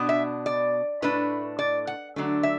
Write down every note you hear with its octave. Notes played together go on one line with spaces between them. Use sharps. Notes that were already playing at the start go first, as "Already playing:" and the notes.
Already playing: B2 B3 D4
E5
D5
A2 A3 D4 B4
D5
F#5
D3 F#3 A3 D4
E5